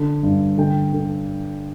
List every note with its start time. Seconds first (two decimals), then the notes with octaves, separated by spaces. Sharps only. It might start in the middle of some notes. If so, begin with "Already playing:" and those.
Already playing: D3
0.23 G2
0.58 D3 G5
0.93 D3